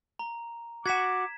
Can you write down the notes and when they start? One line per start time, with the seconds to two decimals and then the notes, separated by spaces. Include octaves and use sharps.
0.19 A#5
0.86 F#4 F#5 D6 G#6 B6 E7